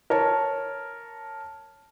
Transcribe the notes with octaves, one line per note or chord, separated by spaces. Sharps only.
A#4 C#5 A5